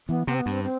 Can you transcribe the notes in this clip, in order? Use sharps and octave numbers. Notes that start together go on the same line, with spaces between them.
E3 B3
C3 B3
C4
B3
G2
C4
C4